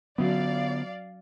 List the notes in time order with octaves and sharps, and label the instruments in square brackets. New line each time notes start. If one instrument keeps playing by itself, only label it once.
[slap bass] D3 B3 [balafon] F#3 C#4 F#4 [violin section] D5 F5